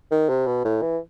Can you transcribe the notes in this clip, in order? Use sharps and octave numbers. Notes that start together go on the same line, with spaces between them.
D#3
C3
B2
A2
E3